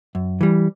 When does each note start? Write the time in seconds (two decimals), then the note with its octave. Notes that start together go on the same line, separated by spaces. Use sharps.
0.15 F#2
0.41 E3 G3